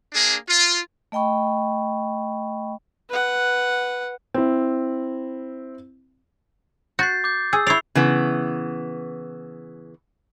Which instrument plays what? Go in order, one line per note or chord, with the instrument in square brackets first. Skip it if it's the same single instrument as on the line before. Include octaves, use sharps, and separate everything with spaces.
[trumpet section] A#3 D4 G#4
F4
[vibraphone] A3 D#5 G5 B5 C#6
[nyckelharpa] B4 F#5
[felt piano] C4 E4
[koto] F#4 [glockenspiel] G6 A6 C7
[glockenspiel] D6 G6
[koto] G#4 [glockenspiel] E6
[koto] E4 D5 [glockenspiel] C#6 C7 F7
[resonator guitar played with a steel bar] C#3 E3 B3